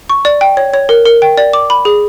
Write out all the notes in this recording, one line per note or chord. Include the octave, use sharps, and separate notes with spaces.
C#6
D5
G5
C#5
C#5
A#4
A#4
G5
D5
D6
B5
G#4